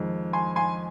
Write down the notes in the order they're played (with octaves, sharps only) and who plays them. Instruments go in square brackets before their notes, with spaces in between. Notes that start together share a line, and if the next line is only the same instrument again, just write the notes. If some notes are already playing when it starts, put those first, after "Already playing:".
Already playing: [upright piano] F2 D#3 G#3
G#5 C6
G#5 C6